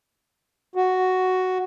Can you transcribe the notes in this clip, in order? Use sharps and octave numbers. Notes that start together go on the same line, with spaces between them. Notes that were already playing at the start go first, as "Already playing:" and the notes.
F#4